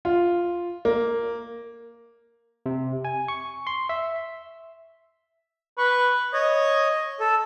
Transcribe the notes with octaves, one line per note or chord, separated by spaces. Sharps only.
F4
A#3
C3
G#5
C#6
C6
E5
B4 C#6
C#5 D#5
A4